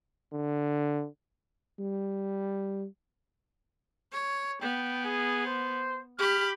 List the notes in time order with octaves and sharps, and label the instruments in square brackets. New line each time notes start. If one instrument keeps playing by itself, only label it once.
[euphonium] D3
[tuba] G3
[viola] C#5
[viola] B3 [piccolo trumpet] G5
[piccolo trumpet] G#4
C5
[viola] G4 B5 [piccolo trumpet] F6